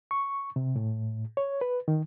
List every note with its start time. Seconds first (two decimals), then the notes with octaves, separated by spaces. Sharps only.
0.11 C#6
0.56 C3
0.76 A2
1.37 C#5
1.61 B4
1.88 D#3